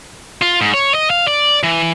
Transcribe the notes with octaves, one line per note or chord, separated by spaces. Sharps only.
F4
G#2
C#5
D#5
F5
D5
E3